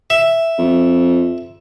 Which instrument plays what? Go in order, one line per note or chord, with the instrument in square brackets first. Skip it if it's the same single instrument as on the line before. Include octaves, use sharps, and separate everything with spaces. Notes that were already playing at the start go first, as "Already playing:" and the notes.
[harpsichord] E5
[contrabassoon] F2